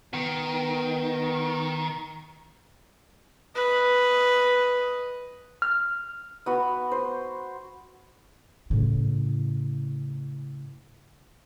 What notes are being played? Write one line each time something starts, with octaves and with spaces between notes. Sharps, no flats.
D#3 B3
B4 D#5
F6
B3 F#4
C5
A2 C#3